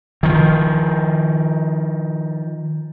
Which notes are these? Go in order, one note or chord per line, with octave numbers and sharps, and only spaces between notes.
D#3 F3